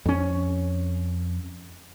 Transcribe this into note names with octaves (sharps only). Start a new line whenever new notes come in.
F2 C#4